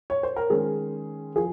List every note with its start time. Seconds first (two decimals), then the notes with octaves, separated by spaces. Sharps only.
0.10 C#5
0.23 C5
0.36 A#4
0.50 D#3 G#3 C#4 G#4
1.36 F3 G#4